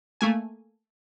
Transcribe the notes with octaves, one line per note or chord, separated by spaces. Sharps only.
A3 A#3 G#5